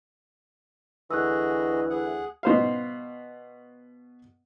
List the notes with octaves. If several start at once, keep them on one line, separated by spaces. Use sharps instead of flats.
D2 E3 F#4 G#4 D#5 E6 F#6
G#4 F#5
B2 C5 F5